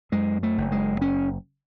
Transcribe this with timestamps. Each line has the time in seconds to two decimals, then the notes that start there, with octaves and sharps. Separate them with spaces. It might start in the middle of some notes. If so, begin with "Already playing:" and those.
0.12 F#2 G#3
0.43 A3
0.58 F#1
0.72 G#3
1.01 C#4